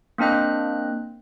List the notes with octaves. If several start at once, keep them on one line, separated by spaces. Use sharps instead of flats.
A#3 C4 D4 D#5 F#6